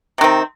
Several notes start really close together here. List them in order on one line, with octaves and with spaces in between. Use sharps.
C3 D#3 C4